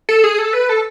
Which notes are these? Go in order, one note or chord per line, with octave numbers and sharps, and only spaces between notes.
A4
G#4
A4
B4
A4